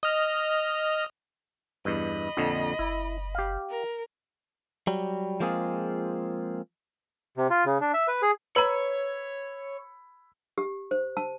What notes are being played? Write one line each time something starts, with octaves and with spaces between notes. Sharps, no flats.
D#5 F6
E2 G2 D#5 B5
A#1 F2 D3
F#1 E4
G4 F5
A#4
F#3 G3
F3 G#3 A#3 C4 F4 G#4
C3
F4
C#3
D4
E5
B4
G#4
B4 C#5 A#5 B5 E6 G#6
G4
C5
A5